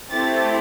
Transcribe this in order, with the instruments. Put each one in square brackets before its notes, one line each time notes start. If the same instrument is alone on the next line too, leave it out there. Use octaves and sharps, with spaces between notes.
[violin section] A3 C4 E4 G4 A6